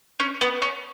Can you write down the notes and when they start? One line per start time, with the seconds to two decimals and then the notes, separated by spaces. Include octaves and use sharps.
0.20 C#4
0.41 B3
0.62 C#4